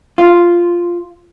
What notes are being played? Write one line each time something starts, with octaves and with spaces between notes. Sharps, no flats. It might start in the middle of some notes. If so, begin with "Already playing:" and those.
F4